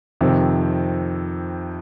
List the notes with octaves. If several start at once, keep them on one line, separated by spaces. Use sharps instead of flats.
F2 C3 D#3